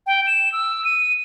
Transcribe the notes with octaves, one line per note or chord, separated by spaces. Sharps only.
G5
E7
E6
D#7